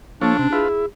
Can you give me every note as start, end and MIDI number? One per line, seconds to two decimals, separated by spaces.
0.21 0.37 53
0.21 0.33 58
0.21 0.66 62
0.21 0.37 69
0.21 0.37 73
0.39 0.48 48
0.39 0.51 61
0.52 0.68 64
0.52 0.68 65
0.52 0.85 68
0.52 0.68 71
0.68 0.86 64